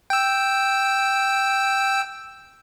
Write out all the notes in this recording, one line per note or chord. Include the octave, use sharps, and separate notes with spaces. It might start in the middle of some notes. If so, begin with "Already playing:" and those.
G5 E6